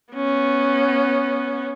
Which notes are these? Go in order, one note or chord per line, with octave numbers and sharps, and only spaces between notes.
B3 C#4